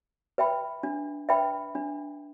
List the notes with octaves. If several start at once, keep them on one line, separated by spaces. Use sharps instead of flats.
B4 E5 G5 B5
D4
B4 E5 G5 B5
D4